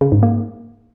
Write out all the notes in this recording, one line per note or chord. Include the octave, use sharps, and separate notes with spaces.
C#3
G#2
A#3